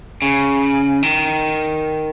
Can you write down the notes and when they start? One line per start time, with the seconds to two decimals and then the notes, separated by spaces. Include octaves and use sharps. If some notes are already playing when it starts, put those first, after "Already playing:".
0.22 C#3
1.03 D#3